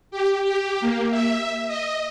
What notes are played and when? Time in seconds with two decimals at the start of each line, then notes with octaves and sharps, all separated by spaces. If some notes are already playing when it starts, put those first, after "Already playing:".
0.11 G4
0.43 G4
0.80 A#3
1.11 E5
1.67 D#5